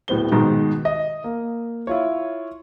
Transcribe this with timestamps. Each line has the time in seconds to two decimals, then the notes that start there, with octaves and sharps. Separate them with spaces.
0.08 D1 A2 B3 C5 G7
0.31 G#2 B2 D#3
0.85 D#5
1.24 A#3
1.87 E4 F4 C#5